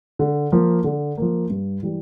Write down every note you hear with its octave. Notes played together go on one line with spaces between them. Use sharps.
D3
F3 A#3
D3
F3 A#3
G2
E3 G3